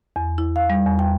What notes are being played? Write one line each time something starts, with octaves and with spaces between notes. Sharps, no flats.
E2
E4
F5
G3
E2
G5